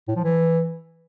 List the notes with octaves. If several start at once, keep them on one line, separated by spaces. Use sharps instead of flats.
A2
F3
E3